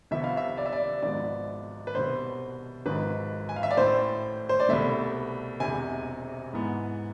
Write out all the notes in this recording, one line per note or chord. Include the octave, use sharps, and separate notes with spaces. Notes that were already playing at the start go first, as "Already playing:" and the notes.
C2 C3 F3 B3 E5
F5
E5
D5
E5
D5
G#1 G#2 F3 B3 D5
B4
C2 B2 B3 C5
G#1 G#2 F3 B4
G#5
F5
E5
D5
A1 A2 E3 C5
C5
D5
C2 B2 A3 E5
E1 E2 C3 G#5
G#2 E3 B3